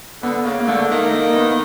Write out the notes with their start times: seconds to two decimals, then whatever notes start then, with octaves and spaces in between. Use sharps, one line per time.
0.22 D3 B3
0.45 C#3 A#3
0.60 A#3
0.68 D3 A3
0.91 D#3 A#3
1.06 A3
1.13 A#3
1.31 A#3
1.36 B3